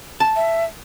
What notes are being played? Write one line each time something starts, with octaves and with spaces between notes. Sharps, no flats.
A5
E5